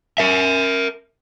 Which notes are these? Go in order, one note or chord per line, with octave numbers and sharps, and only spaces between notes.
A#4 E5